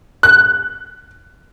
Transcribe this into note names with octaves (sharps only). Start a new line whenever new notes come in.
F#6